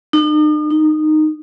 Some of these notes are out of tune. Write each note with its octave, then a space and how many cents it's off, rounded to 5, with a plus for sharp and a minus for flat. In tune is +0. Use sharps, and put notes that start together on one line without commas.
D#4 -45
D#4 -15